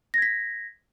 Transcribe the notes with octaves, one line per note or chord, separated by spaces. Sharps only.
G#6 A#6 B6